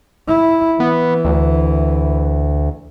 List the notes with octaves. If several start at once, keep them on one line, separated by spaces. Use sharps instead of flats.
E4
E3 B3
D2